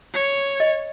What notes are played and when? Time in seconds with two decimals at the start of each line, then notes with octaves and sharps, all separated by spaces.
0.14 C#5
0.60 D#5